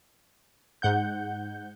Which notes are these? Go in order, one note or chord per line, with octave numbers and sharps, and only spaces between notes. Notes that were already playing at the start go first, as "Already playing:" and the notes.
G#2 F#5 G6